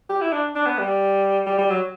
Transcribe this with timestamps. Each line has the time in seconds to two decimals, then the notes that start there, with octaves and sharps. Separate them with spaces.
0.09 G4
0.21 E4
0.33 D4
0.55 D4
0.66 B3
0.79 G3
1.47 G3
1.59 G3
1.70 F#3